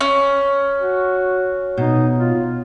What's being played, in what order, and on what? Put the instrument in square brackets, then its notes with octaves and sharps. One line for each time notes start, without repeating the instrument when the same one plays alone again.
[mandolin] C#4
[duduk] F#4
[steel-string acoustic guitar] B2 [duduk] D#4
[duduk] F4